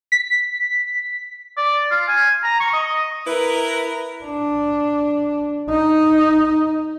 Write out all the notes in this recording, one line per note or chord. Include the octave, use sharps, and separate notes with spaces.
B6
D5
F4
G#5
A#5
C#6
D#5
E4 A#4 B4
D4
D#4